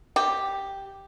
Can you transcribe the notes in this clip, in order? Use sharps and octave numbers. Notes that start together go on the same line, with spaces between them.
G4